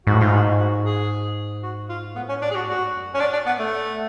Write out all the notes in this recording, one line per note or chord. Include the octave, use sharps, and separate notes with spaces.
G#2 F#4
A2
G#2 F4
F#4
F#4
G#4
F#4
F4
A2 B3
C#4
D4
G#4
F#4
G#2 F#4
F#2
C#4
A2 D4
D4
B3
A3